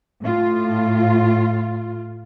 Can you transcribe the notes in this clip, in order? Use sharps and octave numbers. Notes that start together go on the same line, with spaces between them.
A2 F4